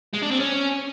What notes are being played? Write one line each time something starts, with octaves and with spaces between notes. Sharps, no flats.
G#3
D4
C4
C#4